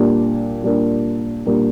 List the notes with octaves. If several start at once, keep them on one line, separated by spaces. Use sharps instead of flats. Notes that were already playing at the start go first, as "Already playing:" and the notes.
Already playing: A#2 G3 D4 G4 A#4
A#2 G3 D4 G4 A#4
A#2 G3 D4 G4 A#4